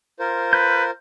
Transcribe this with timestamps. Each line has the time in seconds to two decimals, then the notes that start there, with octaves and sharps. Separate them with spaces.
0.20 F4 A#4 C5
0.53 B4 G6